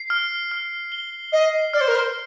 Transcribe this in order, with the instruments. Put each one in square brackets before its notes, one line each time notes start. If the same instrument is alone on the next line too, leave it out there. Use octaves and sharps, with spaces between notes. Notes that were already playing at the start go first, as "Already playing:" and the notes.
Already playing: [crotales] C7
F6
F6
G7
[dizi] D#5 [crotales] C7
[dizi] D5 [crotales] F6
[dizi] C5
A#4
C5